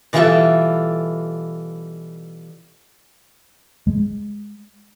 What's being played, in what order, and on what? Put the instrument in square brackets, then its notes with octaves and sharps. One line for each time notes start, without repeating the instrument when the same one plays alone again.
[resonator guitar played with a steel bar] B2 E3 G3 F4 A4 E5
[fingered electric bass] G#3